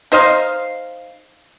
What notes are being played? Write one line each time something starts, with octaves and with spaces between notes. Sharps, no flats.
D#4 C5 D#5 F5